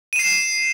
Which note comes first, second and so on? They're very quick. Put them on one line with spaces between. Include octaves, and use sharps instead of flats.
D#7 E7 C7